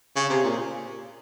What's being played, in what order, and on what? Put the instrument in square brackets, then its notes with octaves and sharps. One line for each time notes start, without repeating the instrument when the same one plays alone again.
[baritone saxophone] C#3
C3
A#2